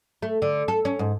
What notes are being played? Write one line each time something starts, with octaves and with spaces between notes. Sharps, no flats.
A3
D3
A4
C#4
G#2